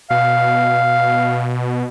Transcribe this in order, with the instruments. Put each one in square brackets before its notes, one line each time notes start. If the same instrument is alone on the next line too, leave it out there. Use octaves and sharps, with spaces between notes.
[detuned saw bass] B2 [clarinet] F5